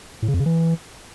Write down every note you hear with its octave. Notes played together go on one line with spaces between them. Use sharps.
A2
C#3
F2
C#3
E3